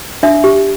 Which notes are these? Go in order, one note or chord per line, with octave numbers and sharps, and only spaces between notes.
D4 E5
G4